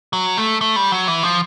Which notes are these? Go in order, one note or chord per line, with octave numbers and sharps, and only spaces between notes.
F#3
A3
A3
G3
F#3
E3
F3